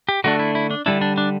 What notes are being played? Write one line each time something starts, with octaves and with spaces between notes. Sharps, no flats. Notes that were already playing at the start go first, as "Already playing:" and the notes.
G4
D3 A3 D4 F#4
E4
E4
D4
D3 G3 D4 E4
D4
D4